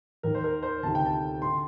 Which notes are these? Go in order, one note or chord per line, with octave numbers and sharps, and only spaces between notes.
D#2 D#3 A#4
C5
A#4
C5
D2 C3 D#3 A5
G5
A5
D3 C6